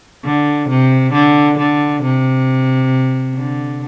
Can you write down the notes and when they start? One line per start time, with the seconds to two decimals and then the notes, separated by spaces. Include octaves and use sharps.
0.25 D3
0.69 C3
1.13 D3
1.58 D3
2.03 C3
3.37 D3